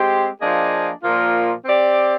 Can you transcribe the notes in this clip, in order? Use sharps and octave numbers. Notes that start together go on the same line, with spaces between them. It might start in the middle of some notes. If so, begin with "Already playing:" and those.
Already playing: G#3 C4 G4
F3 A#3 D4 G#4 D#5
A#2 F3 A#3 F4
C4 G4 D5